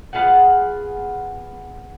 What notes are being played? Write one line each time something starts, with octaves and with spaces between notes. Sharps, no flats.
B3 F4 G#4 F#5